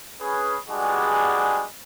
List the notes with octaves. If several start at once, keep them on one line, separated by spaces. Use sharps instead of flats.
C#4 G#4 B4
G3 G#3 B3 D4 F#4 G#4